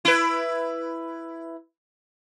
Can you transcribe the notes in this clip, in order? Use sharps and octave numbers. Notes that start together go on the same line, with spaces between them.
E4 B4